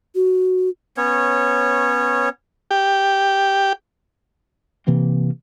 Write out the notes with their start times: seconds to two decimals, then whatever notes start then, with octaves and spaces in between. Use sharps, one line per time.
0.15 F#4
0.97 B3 C#4 C#5
2.71 G4
4.87 C3 E3 A#3 C4